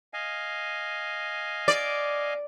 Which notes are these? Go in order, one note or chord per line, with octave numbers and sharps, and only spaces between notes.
D#5 F5 G#5
D5